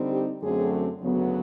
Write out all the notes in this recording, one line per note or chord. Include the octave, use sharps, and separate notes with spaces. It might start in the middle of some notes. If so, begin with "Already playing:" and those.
Already playing: D3 G3 C4 D#4
G4
F#2 D3 F#3 A3 C4 G#4
D2 C#3 F#3 B3